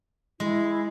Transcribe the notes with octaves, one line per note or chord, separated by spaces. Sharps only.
G#3 E4